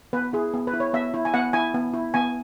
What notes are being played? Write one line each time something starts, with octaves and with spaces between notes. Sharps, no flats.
B3 B4
E4 G#4
B3
B4
E4
C#5
B3 E5
E4
G#5
B3 F#5
E4 G#5
B3
E4
B3 G#5